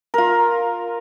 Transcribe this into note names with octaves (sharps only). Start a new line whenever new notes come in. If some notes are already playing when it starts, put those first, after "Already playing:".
F4 A#4